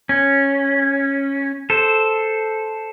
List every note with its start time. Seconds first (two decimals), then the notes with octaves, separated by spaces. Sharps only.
0.09 C#4
1.70 A4 C5